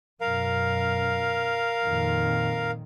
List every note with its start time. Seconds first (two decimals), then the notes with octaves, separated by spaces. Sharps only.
0.21 F#2 B2 A#4 F5
1.83 F2 A#2 D#3